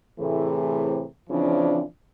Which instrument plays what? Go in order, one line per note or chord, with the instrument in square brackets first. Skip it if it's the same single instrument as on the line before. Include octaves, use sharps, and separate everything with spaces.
[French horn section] A2 C3 E3 A3 C4 G#4
C#3 E3 F3 C4 D4